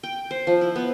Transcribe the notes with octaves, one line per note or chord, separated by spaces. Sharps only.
G5
C5
F3
E4
B3